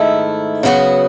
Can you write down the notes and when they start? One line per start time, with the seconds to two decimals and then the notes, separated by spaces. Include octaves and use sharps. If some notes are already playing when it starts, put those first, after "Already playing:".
Already playing: G#2 D#3 A3 E4
0.63 C#3 F#3 B3 F#4